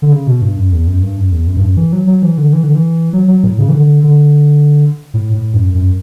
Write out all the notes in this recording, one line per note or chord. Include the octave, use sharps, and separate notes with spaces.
D3
C#3
B2
G2
F#2
E2
F#2
G2
F#2
E2
F#2
G2
F#2
E3
F#3
F#3
E3
D3
E3
D3
E3
F#3
F#3
A2
C#3
E3
D3
D3
A2
A2
F#2
F#2